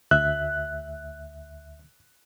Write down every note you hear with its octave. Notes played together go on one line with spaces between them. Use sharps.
D2 E5 F#6